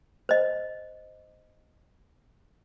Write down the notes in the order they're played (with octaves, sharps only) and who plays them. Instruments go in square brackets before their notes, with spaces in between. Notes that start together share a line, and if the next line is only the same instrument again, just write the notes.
[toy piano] C5 D#5